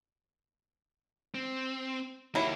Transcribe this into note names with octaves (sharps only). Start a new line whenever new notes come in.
C4
F#3 A#3 E4 G4